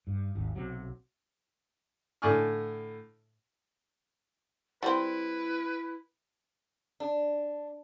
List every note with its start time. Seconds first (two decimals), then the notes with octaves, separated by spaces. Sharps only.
0.07 G2
0.35 G#1 D#2
0.55 B1 C3 F#3
2.22 A2 D3 D5 G#5 C#6 F6
4.83 G3 C4 E4 B4
7.00 D4